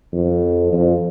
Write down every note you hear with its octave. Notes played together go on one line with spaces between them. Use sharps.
F2
F2